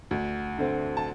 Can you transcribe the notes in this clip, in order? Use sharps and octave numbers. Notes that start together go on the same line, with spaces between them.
D2
D3 A3 C4
A5